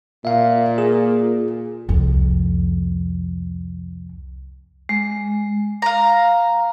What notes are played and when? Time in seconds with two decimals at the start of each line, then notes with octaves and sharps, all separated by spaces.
0.25 A#2 E5 F5
0.78 G#4
1.89 C2 F2
4.89 G#3
5.82 F5 A#5